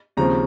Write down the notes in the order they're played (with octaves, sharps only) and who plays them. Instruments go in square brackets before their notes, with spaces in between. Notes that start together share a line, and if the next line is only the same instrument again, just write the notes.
[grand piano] D#2 C#3 F3 C4 A#5